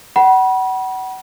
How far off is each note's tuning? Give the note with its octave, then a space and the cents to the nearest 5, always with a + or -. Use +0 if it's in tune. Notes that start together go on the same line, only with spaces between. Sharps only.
F#5 +30 B5 -30